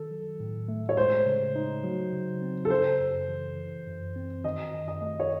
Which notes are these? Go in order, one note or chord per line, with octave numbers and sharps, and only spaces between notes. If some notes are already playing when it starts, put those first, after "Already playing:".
Already playing: D#3 A4
F#3
A2
A3
C#5
G#3 C5
C#3
D#4
F#3
C#3
C4
A4
C#3 C5
F#2
E3
E3
F#2
C4
D#3 D#5
F#2
D#5
A3
C#5